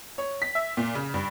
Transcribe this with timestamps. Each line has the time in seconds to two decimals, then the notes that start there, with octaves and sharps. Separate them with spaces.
0.18 C#5
0.42 B6
0.55 E5
0.77 A#2
0.95 C#3
1.14 G2